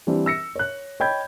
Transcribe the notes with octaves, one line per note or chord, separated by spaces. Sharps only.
E3 G3 C4 D4
E6 A#6 C#7
C#5 F#6
C#5 D#5 G5 B5 G6 G#6